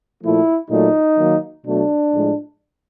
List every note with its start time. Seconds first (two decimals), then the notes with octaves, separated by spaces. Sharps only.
0.22 A#2 F3 A3 E4
0.70 A#2 F#3 A3 D#4
1.18 D#3 F#3 A#3
1.66 B2 F#3 A3 D4
2.14 A2 F3 G#3